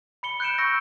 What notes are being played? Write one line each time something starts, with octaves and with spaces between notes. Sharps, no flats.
B5 C#7 G7
F#6 G6 C#7 D7 E7
C#6 E6 F#6 A#6